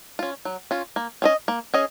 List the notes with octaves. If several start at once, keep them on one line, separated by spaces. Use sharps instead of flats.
C#4 F4
F#3
C#4 F4
A#3
C#4 G#4 D#5
A#3
C#4 G#4 D#5